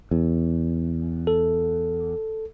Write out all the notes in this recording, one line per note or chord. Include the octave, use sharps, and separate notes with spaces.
E2
A4